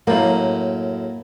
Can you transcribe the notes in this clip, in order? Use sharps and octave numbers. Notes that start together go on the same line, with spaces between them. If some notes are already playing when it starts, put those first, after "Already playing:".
F#2 A2 A#3